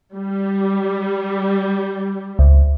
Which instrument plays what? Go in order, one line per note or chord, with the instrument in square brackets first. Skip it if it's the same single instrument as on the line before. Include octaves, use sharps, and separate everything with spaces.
[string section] G3
[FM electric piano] C#2